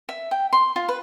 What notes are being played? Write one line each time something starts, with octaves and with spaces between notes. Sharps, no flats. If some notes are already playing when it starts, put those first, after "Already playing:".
E5
G5
C6
F4
B4